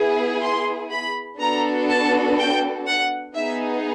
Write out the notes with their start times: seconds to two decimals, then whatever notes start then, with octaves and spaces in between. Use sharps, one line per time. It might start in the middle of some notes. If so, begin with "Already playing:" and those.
Already playing: B3 E4 G#4
0.42 C6
0.91 B5
1.40 B3 D4 F#4 A4 A#5
1.89 A5
2.37 G5
2.86 F#5
3.35 B3 D#4 G#4 E5